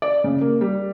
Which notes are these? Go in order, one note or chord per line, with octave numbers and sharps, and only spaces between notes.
D5
C#3
A#3
G3